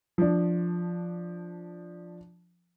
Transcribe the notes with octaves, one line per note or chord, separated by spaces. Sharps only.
F3 D4